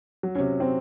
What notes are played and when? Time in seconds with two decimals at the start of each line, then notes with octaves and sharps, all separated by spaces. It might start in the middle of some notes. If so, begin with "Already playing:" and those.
0.23 F#3
0.35 C#4
0.40 C3
0.60 C4